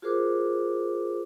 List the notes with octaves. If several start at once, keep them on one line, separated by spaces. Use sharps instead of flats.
F4 F#4 G#4 A#4 C5 D6